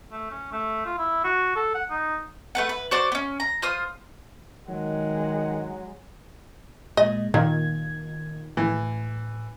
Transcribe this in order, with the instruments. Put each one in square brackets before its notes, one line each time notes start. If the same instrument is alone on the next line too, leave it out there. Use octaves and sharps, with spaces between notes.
[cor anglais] A3
C#4
A3
F4
E4
F#4
A4
F#5
D#4
[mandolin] A3 B4 F#5
B4
F#4 C5 D5
B3 C#4
A#5
F4 C5 D#6 F6
[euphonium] D#3 [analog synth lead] F#3 [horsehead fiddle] G#3 [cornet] F#5
[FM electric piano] A#2 G#3 [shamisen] D#5
[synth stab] A#2 D#3 [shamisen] A#3 [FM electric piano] G#6
[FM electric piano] A2 [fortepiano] E3